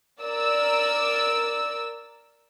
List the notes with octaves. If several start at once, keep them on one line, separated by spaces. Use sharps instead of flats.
A#4 D5 E6